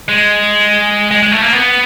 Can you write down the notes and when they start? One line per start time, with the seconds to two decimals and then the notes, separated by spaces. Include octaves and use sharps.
0.08 G#3
1.11 G#3
1.22 G#3
1.32 A3
1.42 A#3
1.53 B3